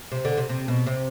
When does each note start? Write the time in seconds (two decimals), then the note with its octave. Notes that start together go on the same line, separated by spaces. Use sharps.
0.12 C3
0.25 D3
0.37 C3
0.49 C3
0.68 B2
0.87 C3